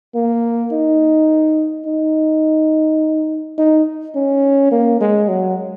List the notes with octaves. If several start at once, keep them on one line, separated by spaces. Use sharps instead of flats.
A#3
D#4
D#4
D#4
C#4
A#3
G#3
F#3